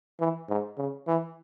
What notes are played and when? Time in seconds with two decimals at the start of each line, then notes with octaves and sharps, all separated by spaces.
0.20 E3
0.49 G#2
0.78 C#3
1.07 E3